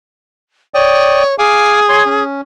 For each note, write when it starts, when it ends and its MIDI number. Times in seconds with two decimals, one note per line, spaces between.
0.74 1.37 73
0.74 1.23 74
0.74 1.23 79
0.74 1.23 87
1.38 2.23 68
1.38 1.80 77
1.38 1.80 80
1.38 1.80 86
1.89 2.03 73
1.89 2.03 84
2.06 2.41 61